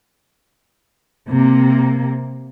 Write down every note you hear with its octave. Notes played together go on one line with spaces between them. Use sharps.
C3 A#3